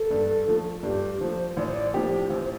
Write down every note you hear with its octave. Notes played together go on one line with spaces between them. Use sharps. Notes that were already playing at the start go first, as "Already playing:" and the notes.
Already playing: A4
G2
F3 A3
G2 G4
F3 A3 C5
A1 D5
C5
D5
A2 F3 C4 G4
A1 C5
C5